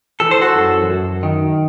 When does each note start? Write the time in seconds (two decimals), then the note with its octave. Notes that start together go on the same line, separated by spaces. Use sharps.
0.20 E3 A4
0.31 C5
0.41 F#4 A4
0.55 F#2
0.89 F#2
1.23 D#3